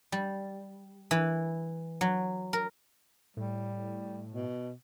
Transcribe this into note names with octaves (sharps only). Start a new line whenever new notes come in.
G3
E3
F#3
A#4
A2 G3
B2